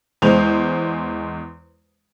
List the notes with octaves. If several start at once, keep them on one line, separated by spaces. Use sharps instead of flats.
E2 G#3 C5 F7